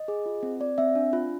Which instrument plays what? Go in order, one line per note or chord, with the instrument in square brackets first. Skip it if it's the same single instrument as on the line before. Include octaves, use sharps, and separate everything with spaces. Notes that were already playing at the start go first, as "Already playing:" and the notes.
Already playing: [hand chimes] D#5
G#4
F4
C4
C4 D5
C4 E5
D4
F4